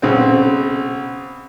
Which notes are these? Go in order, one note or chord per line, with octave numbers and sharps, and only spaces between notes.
B1 C#3 C4